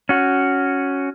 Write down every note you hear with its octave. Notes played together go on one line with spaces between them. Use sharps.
C#4 F#4